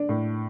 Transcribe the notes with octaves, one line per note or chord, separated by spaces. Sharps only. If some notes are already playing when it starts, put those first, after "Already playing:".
Already playing: D4
A2